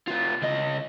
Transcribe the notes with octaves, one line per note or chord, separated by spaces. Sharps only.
C3 F4
C#2 D#5